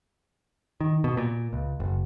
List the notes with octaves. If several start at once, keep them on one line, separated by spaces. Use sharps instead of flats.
D#3
B2
A#2
C#2
F#1